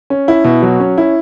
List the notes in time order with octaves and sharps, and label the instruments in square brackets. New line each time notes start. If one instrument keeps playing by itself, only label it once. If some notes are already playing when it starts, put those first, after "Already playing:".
[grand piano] C#4
E4
B2
F#3
C#4
E4